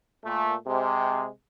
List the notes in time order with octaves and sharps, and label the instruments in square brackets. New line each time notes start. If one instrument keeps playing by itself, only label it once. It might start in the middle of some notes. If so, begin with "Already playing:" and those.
[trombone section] A#2 A3
C3 G#3